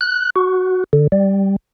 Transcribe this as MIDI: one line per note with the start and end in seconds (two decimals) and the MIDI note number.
0.01 0.30 90
0.36 0.84 66
0.93 1.07 50
1.12 1.56 55